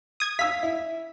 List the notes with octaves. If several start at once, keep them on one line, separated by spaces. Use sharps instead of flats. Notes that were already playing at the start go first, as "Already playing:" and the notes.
D#6 G#6
F5 E6 B6
E4